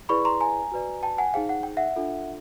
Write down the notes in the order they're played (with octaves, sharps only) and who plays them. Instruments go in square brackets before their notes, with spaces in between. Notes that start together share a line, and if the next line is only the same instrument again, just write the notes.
[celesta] E4 G#4 B4 D5 B5 C#6
A#5 C6
G#5 A#5
F#4 B4 D5
G5 A5
F#5 G#5
D#4 G#4 C5 F5 G5
F#5
G5
E5 F#5
D4 F4 A4